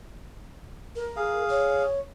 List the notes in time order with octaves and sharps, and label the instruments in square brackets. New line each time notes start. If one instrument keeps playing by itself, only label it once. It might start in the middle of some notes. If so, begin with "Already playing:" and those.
[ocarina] A#4
[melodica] G#4 F5
[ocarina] C#5